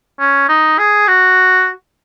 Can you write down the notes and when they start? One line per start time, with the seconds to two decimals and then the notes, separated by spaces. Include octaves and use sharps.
0.20 C#4
0.49 D#4
0.79 G#4
1.08 F#4